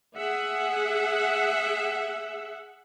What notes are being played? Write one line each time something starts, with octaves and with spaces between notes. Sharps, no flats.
G#4 E5 F#5